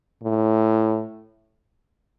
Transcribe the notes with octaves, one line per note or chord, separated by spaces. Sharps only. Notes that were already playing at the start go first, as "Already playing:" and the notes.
A2